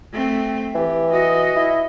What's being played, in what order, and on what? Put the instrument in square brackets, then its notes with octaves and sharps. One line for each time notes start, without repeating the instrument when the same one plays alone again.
[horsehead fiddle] A3 C4
[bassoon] E3 [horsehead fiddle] G4
[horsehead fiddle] F#4 D#5
[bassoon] E4